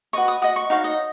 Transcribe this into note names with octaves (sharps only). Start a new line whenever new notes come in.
F#4 B4 D#5 C#6
D#6
F#4 B4 D#5 D#6
C#6
D#4 F#4 C#5 F5
D#5